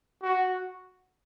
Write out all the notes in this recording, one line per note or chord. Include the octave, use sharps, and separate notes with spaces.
F#4